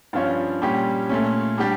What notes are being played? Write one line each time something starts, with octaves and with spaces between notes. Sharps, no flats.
G2 F3 C#4 F4 C#5
A#2 G3 C#4 G4
A#2 A3 C#4
G3 D4 G4